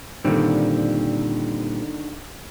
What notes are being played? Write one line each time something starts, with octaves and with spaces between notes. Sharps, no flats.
A#2 D3 D#3 G3 C4